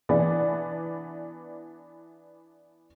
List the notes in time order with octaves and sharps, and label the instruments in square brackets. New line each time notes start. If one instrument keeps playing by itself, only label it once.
[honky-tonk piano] E3 B3 D4 D5